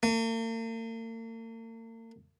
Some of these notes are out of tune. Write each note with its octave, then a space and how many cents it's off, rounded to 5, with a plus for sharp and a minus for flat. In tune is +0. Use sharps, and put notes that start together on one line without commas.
A#3 -45